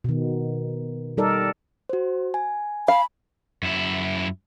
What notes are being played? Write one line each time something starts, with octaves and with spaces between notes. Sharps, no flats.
B2 D#3
G3 D#4 A4 A#4 D5
F#4 C5
G#5
F5 B5
F#2 E4